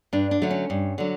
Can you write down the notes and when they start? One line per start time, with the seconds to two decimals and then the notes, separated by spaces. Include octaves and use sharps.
0.13 G2 D4
0.31 D4
0.42 D3 F#3 A3
0.50 C#4
0.70 G2
0.98 D3 F#3